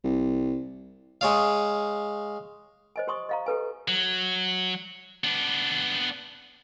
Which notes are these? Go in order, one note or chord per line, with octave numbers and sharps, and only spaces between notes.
C2
G#3 C#5 F5
C5 D#5 G#5
G4 C5 G#5 C6 C#6 D#6
D#5 F5 A#5
G4 A4 B4 G#5
F#3
B3 D4